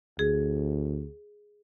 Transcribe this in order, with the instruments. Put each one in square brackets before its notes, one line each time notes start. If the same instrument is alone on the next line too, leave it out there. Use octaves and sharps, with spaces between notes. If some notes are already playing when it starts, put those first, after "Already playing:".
[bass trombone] D2 [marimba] G#4